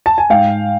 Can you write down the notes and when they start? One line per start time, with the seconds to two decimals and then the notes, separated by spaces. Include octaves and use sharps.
0.06 A5
0.18 G#5
0.30 G#2 F5 G5